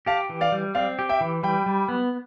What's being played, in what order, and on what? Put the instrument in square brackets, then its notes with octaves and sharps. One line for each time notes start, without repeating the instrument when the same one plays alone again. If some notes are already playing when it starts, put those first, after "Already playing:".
[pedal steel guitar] G4 [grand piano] F5 A5
[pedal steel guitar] E3
[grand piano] D5 F5
[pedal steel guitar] G3
[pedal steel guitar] C4 [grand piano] D5 F5
[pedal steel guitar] G4
[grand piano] E5 G5
[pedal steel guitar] E3
[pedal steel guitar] G3 [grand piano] G5 B5
[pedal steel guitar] G3
B3